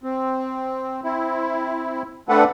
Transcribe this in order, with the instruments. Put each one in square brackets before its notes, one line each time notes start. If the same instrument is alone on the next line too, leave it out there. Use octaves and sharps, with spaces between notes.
[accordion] C4
C4 E4
A3 C4 D4 A4 B4 F#5